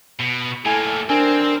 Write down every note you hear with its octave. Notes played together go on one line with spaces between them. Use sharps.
B2
A2 A#3 E4 A4 G#5
C4 D4 A#4 C5 G#5